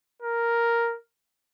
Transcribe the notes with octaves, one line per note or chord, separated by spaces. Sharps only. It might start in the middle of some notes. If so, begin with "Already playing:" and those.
A#4